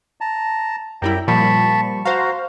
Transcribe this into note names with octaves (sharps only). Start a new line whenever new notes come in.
A5 A#5
F#2 G3 E4 G5 A#5
A#2 F3 G3 A5 B5 C#6
F#4 C5 F5 A#5